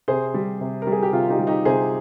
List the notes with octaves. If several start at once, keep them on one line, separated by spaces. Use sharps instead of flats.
C3 G#4 C5
G3
C3
G3 A#4
G#4
G4
C3 F4
D#4 G4
G3
D#4 G4
C3 G#4 C5